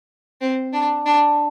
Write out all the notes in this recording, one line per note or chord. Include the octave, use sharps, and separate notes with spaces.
C4
D4
D4